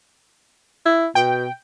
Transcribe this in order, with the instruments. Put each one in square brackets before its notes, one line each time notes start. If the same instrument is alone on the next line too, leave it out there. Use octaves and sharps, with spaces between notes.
[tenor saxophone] E4
[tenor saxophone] B2 [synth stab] G5